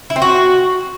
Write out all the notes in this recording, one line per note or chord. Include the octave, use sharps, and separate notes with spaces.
E4
C4
F#4